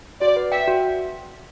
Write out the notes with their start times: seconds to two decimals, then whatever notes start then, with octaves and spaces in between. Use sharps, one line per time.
0.21 F#4 D5
0.36 B4
0.52 E5 G5
0.67 F#4